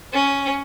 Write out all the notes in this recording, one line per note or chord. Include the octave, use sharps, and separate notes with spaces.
C#4